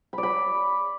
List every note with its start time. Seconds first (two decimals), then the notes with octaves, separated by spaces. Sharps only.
0.13 B5
0.18 D5
0.23 B5